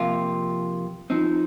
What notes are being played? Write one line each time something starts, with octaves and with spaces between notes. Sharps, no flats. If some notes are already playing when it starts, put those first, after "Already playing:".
Already playing: C3 F3 A#3 F4
F3 C4 D#4